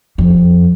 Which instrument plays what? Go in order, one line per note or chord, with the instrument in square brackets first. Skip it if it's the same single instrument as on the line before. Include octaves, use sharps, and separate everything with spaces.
[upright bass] F2